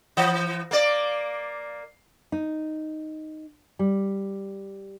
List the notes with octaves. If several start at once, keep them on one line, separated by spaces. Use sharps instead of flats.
E3
A#3 D5
D#4
G3